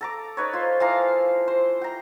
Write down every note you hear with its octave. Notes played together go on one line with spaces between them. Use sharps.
A4 A#5 D6
D#4 B4 C#5
F4 C5
E3 F3 F5 A#5
C5
G5 A#5